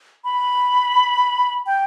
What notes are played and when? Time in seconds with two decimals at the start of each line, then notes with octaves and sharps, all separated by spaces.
0.24 B5
1.66 G5